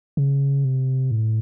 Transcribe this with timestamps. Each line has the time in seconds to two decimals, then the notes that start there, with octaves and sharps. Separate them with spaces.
0.17 C#3
0.65 C3
1.11 A2